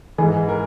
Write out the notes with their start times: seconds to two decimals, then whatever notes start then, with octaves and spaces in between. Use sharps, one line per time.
0.18 G#2 E3 G#4
0.49 A#4